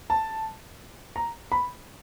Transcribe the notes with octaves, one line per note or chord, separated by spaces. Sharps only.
A5
A#5
B5